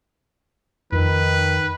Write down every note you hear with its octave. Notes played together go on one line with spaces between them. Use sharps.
F2 D#3 B4